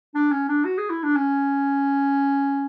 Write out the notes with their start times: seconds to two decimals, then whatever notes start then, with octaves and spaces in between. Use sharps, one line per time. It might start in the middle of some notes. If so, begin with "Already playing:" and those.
0.15 D4
0.32 C#4
0.48 D4
0.64 F#4
0.78 G#4
0.90 E4
1.03 D4
1.16 C#4